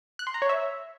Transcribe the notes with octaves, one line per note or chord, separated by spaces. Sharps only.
F#6
C6
A#5
C#5
E5